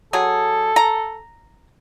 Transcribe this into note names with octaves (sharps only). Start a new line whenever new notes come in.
F#3 G#4 A4
A#5